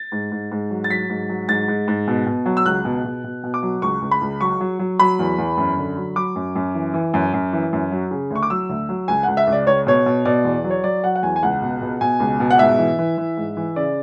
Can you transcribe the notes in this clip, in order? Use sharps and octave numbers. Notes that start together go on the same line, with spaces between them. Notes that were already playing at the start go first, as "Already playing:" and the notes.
Already playing: A6
G#2
G#2
G#2
F#3
A6
F#3 B6
G#2
F#3
G#2 A6
G#2
G#2
B2
B2
F#3
E6
C#2 F#6
B2
B2
B2
B2
D6
F#3
C#2 C#6
C#2
B5
C#2
F#3 C#6
F#3
F#3
F#3 B5
E2
E2
F#2
D3
F#3
F#3 D6
F#2
F#2
E3
E3
F#2
F#2
E3
F#2
F#3
C#3
D2 C#6
D6
F#3 E6
D2
F#3
C#2 G#5
C#2 F#5
E5
C#2
D5
C#2 C#5
B2 C#5
B2
B2 D5
E2
F#3
C#5
F#3 D5
F#3 F#5
F#5
E2 G#5
G#5
C#2 F#5
B2
B2
B2 G#5
C#2
B2
F#5
G#2 E5
E3
E3
E3
G#2
E3
C#3 D5